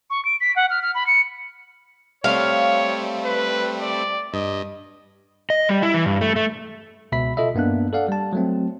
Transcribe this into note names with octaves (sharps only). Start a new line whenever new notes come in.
C#6
D7
B6
F#5
F6
F6
B5
C#7
G3 A3 C4 C#5 F5
B4
D5
G2 D#5
D#5
G3
E4
E3
G2
A3
A3
C#2 B2 E5 B5 B6
F4 A4 D#5 E5
G2 A#3 B3 D4 F#6
A4 D5 F5 F#5
G3 A5
F#3 A3 C4